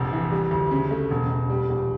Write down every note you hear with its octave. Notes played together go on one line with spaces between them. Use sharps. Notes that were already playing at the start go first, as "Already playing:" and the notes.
Already playing: F1 A#1
E3
G3
D2
C#3
A3
E1
E1
G3
A#1